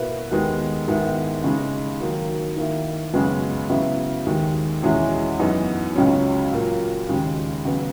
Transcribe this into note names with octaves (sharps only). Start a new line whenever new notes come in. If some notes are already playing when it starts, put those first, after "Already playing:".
Already playing: B2 A#3 E4 B4
D#2 D#3 G#3 B3
G#2 D#3 G#3 B3 E4
C#3 G#3 D#4
D#3 F#3 A#3
D#3 A#3 E4
F#2 C#3 G#3 B3
C#3 F#3 B3 E4
D#2 D#3 G#3
E2 B2 G#3 C#4 E4
F#2 E3 B3 D#4 F#4
C#2 C#3 F#3 C#4
A#2 F#3 A#3
D#2 C#3 G#3
C#3 F#3 B3